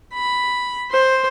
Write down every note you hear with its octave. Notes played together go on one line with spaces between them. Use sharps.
B5
C5